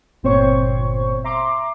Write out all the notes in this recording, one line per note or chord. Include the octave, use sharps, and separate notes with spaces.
G1 A#2 C4 C5 C#5 C#6
E5 A#5 C6 D6